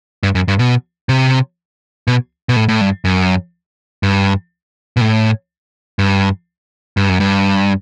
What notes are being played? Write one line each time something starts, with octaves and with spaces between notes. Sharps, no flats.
G2
F#2
G2
B2
C3
B2
B2
A2
A2
G2
F#2
G2
B2
A2
G2
G2
F#2
G2